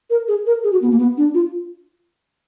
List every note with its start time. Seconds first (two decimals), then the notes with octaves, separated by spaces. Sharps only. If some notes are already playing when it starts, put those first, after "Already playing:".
0.10 A#4
0.28 G#4
0.46 A#4
0.64 G#4
0.72 F#4
0.82 B3
0.91 A#3
0.99 B3
1.17 D4
1.34 F4